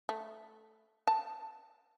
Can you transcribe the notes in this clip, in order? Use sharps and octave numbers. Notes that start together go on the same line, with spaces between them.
A3
A5